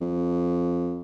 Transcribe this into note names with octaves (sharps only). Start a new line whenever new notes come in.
F2